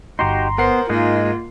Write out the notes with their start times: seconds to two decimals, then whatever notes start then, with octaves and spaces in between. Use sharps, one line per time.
0.19 G1 D#4 F#4 G4 A#5 C6
0.58 B3 A#4 C5 F#5 C7
0.89 G#2 G#3 A#3 D#4 F4 G#4